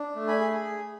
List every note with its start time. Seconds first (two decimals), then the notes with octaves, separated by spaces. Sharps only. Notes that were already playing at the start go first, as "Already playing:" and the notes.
Already playing: D4
0.15 A3
0.28 G#5 B5
0.40 G#4